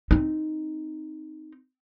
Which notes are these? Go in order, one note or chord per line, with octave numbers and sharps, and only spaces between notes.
C4 D#4